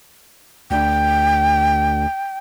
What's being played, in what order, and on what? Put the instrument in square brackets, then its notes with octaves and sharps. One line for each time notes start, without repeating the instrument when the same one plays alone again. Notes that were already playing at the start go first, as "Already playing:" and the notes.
[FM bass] D2 [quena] G5